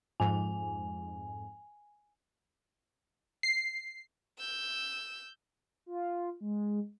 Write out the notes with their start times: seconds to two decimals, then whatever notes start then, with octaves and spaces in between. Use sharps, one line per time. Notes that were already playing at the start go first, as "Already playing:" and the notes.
0.20 F2 G#2 G#5
3.43 C7
4.39 E6 G6
5.86 F4
6.41 G#3